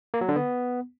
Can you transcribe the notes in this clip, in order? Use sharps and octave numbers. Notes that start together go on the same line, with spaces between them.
A#3
F#3
D3
B3